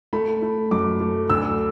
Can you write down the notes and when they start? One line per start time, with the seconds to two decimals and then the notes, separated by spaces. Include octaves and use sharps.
0.13 A3 B5
0.42 A3
0.71 F#2 D6
1.00 A3
1.30 D2 E6